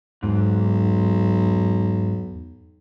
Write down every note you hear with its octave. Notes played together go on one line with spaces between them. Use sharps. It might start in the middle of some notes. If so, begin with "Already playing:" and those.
B1 E2 G#2